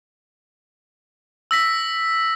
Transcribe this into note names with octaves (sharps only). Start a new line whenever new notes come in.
E6 A#6 B6